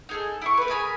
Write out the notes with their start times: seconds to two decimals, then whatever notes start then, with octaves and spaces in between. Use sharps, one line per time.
0.09 D#4 G#4 A4
0.42 E4 E5 C#6
0.57 A3 B4
0.70 G#4 A#4 G#5 B5